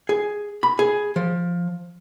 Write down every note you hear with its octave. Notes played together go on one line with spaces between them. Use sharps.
G#4
B5
G#4
F3